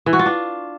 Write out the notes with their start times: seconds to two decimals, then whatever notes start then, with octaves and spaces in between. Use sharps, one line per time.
0.06 E3
0.13 F#4
0.19 F4
0.26 D4